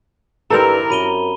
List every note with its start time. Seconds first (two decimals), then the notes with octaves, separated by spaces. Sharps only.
0.50 G2 C4 E4 G4 A4 A#4 A#5 F7
0.90 F#2 B5 D#7 G7